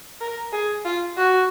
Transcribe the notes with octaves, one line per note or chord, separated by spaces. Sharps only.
A#4
G#4
F4
F#4